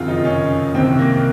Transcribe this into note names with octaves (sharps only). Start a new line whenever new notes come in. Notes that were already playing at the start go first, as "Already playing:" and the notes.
Already playing: F#1 F2 C3 D#3 F4 G#4
D#4
C#4
C2 C3 D#3 C4
A#3